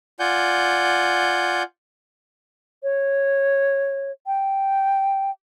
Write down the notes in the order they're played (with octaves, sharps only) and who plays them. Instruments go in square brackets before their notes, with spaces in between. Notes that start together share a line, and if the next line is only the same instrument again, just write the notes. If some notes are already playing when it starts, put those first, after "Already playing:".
[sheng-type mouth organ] F4 D5 F#5 G#5 G6
[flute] C#5
G5